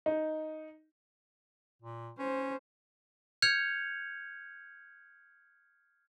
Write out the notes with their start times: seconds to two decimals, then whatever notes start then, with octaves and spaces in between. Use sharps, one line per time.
0.06 D#4
1.82 A#2
2.18 C#4 C5
3.42 F6 G6 G#6 C#7 F7